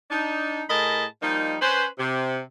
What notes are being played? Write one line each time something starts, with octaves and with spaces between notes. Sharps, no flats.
D4 D#4
A2 G#4 A#4 D#5 A5 B5
F3 G3 A#3 D#4
C#4 B4 C5
C3